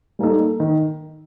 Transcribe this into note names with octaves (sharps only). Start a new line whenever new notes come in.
G3 A#3 D#4 A4
D#3